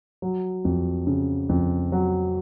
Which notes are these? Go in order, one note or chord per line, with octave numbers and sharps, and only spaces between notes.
F#3
F2
C#3
F2
F#3